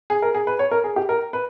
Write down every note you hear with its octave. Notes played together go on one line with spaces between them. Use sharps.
G#4
A#4
G#4
B4
C#5
A#4
G#4
G4
A#4
B4